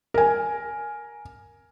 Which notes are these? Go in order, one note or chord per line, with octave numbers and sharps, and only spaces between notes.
A#4 G#5